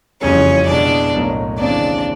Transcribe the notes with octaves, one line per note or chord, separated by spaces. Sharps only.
F#1 F2 C#3 E3 G3 C#4 C#5
B2 G#3 B3 D4 E4 D5
B1 A2 F#3 A#3 D#4
D#2 C#3 E3 G#3 C4 D4 D5